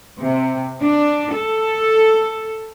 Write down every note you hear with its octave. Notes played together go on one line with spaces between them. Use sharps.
C3
D4
A4